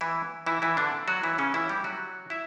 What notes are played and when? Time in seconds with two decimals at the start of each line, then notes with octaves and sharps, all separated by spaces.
0.01 E3 E4
0.46 E3 E4
0.62 E3 E4
0.77 D3 D4
1.08 F#3 F#4
1.23 E3 E4
1.38 C#3 C#4
1.54 E3 E4
1.69 G3 G4
1.84 F#3 F#4
2.30 E4 E5